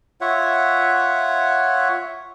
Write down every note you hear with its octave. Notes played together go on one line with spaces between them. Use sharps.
F4 C#5 E5 F#5